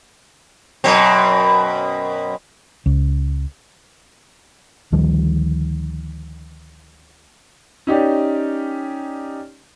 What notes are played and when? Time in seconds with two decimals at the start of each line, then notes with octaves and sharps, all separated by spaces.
0.84 F#2 B2 C4
2.86 C#2
4.92 D2 D#3 F3 G3
7.87 C#4 D#4 G4 D5